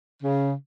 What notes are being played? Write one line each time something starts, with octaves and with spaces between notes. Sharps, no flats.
C#3